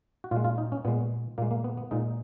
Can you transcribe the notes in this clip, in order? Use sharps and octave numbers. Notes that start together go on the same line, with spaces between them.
F#4
A#2 G#3 F4
F4
D#4
C#4
A#2 G#3 B3
A#2 G#3 A#3
A#3
B3
B3
A#2 G#3 D#4